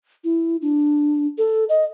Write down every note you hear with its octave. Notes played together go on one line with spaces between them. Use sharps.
E4
D4
A4
D#5